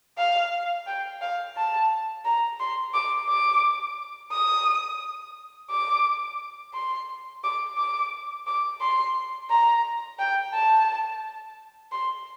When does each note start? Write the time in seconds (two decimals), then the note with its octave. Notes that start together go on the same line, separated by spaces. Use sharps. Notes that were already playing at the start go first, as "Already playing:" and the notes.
0.18 F5
0.87 G5
1.21 F5
1.56 A5
2.25 A#5
2.60 C6
2.94 D6
3.29 D6
4.32 D#6
5.70 D6
6.74 C6
7.44 D6
7.78 D6
8.47 D6
8.81 C6
9.50 A#5
10.19 G5
10.54 A5
11.92 C6